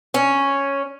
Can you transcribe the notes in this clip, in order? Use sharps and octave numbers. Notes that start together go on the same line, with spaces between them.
C#4